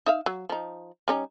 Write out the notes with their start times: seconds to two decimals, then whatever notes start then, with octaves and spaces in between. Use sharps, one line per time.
0.06 D#4 E5 F5
0.26 F#3
0.49 F3 D#4
1.08 G3 C#4 D#4